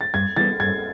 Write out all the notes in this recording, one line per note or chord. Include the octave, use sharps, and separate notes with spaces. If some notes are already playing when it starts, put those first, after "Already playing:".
A6
G2 G#6
E3 G3 B3 A6
G2 G#6